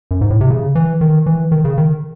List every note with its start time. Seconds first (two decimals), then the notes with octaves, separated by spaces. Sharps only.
0.11 F#2
0.21 G#2
0.30 A2
0.41 C3
0.50 C#3
0.75 E3
1.01 D#3
1.26 E3
1.52 D#3
1.64 C#3
1.78 D#3